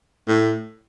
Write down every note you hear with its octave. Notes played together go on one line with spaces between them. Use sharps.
A2